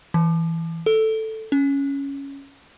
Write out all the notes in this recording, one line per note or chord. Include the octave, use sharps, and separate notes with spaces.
E3
A4
C#4